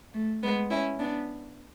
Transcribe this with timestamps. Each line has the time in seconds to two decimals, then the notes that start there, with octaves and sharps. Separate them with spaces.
0.14 A3
0.43 G#3 B3
0.71 C#4 E4
0.99 B3 D4